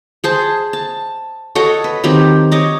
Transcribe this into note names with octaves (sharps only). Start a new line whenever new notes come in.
G#4 C5 A5
A5
F#4 A4 C#5 D#5
B4
D#3 F#3 C4 G4
C#5 D#5 D6